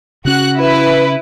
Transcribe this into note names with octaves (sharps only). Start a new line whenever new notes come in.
C#3 C#4 F#4 F#6
E4 B4